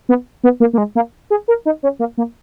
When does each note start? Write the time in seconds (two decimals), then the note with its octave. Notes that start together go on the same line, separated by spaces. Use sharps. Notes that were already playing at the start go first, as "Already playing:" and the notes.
0.09 B3
0.44 B3
0.60 A#3
0.73 A#3
0.78 G#3
0.95 A#3
1.30 G#4
1.48 A#4
1.65 D#4
1.83 C#4
1.99 A#3
2.18 A#3